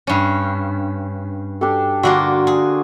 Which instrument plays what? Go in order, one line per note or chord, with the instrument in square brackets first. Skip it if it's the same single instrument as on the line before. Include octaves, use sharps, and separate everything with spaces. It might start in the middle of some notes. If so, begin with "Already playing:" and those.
[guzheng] G2 C#4
[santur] D4 G4 A4
[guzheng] D3 A#3 F4 [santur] F#4
[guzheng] G#4